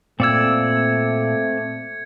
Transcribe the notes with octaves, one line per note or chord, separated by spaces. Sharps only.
A#2 A3 C4 D5 E6 G#6 C#7